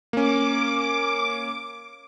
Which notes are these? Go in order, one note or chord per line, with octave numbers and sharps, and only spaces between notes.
A#3 C#4 D6